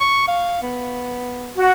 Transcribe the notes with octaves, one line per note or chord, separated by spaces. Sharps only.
C#6
F5
B3
F#4